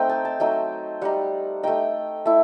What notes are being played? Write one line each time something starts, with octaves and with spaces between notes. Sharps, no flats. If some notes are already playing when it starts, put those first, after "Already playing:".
Already playing: A3 C4 D#4 G5
A5
A5
F#3 A3 D#4 G5
G3 D#4 F#5
A3 D#4 G5
A3 E4